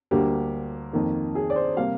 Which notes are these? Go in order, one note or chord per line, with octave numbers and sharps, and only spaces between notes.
D2 D3 G3 A#3 G4
F2 D#3 A#3
G#4
D5
C5
C3 G3 A#3 F5